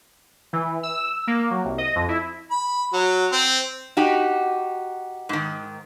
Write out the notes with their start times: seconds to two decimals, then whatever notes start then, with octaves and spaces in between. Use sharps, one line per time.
0.53 E3
0.83 E6
1.27 A#3
1.51 F#3
1.65 C2
1.78 D#5
1.96 F2
2.08 E4
2.51 B5
2.93 F#3
3.32 C4
3.97 D#4 F#4 G4
5.29 G#2 D#3